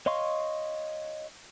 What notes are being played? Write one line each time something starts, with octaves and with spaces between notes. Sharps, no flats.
C#5 D#5 F5 C6 C#6